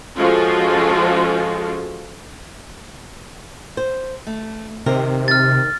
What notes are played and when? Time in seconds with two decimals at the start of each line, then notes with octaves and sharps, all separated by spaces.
0.16 F3 G#3 C#4 F4 F#4 A4
3.77 C5
4.27 A3
4.86 C3 D#3 C4 A#4
5.28 F6 A6